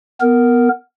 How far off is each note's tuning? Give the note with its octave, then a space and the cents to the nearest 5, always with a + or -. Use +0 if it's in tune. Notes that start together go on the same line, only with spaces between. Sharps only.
B3 +0 A#4 +0